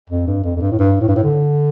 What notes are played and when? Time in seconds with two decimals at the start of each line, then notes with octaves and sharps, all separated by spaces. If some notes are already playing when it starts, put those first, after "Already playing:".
0.09 F2
0.27 G2
0.44 F2
0.57 F2
0.61 G2
0.72 A2
0.79 G2
1.01 A2
1.08 G2
1.16 A2
1.23 D3